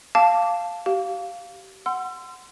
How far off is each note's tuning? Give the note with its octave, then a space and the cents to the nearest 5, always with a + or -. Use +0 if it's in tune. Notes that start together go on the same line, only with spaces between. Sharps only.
F5 +0 A5 +0 D6 -15
G4 -30 F5 +0
F#5 +0 C6 -20 E6 +40